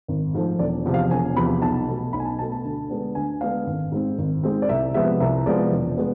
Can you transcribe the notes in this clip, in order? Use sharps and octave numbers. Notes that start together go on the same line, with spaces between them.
G#1
G#2 F3 A3
E1 D5
E2 C3 F3
F5
E1 G#5
E2 C3 F3 B5
B1 A5
B2 A3
B1 B5
G#5
A5
B2 A3 A5
A5
D2
D3 G#3 B3 D4
D2 G#5
D3 G#3 B3 D4 F5
G#1
G#2 G#3 C4
G#1
G#2 G#3 C4
D5
C2 E5
C3 F3 G#3 B3 E5
C2 E5
C3 F3 G#3 B3 D5
E1
G#3 B3